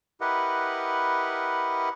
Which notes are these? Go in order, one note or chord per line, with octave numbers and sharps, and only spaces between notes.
E4 G4 A#4 B4 D#5 F#5